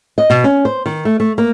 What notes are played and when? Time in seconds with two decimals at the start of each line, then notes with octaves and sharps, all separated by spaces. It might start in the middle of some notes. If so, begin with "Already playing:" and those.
0.18 D#5
0.30 B2
0.44 C#4
0.65 C5
0.86 D#3
1.05 A3
1.20 A3
1.38 A#3